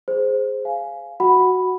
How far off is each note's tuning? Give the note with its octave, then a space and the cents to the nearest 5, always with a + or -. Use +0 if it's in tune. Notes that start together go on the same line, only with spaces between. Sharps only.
G#4 +0 C5 +0
F5 -10 G#5 +10
F#4 +0 F#5 +0 B5 +0